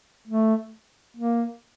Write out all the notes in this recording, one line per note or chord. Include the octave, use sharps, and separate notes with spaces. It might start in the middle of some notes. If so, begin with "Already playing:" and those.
A3
A#3